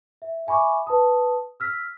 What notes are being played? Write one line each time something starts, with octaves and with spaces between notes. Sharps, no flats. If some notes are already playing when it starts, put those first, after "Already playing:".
E5
E5 G#5 B5 C#6 D6
B4 A5 D#6
E6 F6 B6